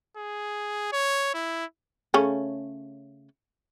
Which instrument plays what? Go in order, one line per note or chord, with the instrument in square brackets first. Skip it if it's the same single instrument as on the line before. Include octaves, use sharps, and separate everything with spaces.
[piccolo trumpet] G#4
C#5
E4
[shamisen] C#3 A3 C#4